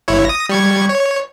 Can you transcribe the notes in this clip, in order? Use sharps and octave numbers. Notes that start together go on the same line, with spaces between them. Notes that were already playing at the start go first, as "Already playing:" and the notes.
G1 E4 C#5
D#6 A#6
G3 C#6 G#6
C#5